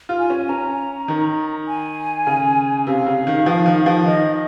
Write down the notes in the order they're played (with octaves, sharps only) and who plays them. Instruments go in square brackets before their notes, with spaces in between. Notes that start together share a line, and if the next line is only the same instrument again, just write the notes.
[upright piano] F4
[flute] G#5
[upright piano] C#4
[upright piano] C#4 [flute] A#5
[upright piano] D#3
[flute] G#5
[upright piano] C#3
[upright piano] C3 [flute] F5
[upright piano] C#3
D#3
F3
D#3
F3
[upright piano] D#3 [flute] D#5